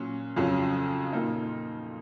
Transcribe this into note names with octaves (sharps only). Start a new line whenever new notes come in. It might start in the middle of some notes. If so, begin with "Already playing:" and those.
Already playing: A#2 F#3 C#4
F2 C#3 F#3 C#4 F4
A#2 F3 A#3 D#4